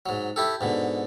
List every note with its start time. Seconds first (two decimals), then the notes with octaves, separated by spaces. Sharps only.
0.06 G#2 F#3
0.36 E4 G4 A4
0.61 G#2 B2 D3